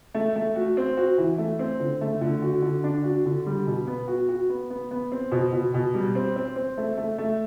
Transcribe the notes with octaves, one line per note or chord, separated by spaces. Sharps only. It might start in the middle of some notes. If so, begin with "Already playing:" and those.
A3
A3
F#4
C4
F#4
E3
A3
C4
D3
A3
D3
F#4
D3
D4
F#4
D3
G3
B2
B3
F#4
F#4
B3
B3
B3
C4
B2
B2
B2
G3
C4
C4
C4
A3
A3
A3